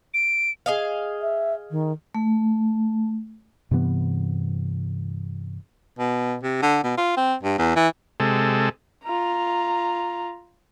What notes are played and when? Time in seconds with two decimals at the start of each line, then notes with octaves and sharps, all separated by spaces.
0.14 D7
0.66 G#4 D#5 F5
1.22 E5
1.71 D#3
2.15 A3
3.71 G2 C3 E3 B3
5.99 B2
6.43 C3
6.62 D3
6.84 B2
6.97 F4
7.17 C4
7.43 G2
7.59 E2
7.76 E3
8.20 C3 G#3 A4
9.04 F4 A#5